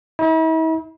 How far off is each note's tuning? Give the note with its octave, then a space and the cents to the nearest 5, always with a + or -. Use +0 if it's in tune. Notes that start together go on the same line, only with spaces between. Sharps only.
E4 -45